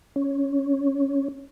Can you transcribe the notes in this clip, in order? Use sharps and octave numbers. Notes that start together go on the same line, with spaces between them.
C#4